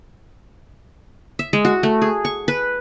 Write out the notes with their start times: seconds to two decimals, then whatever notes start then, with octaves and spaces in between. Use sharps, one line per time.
1.39 E5
1.53 G#3
1.65 F#4
1.83 A3
2.02 G#4
2.25 C#6
2.48 B4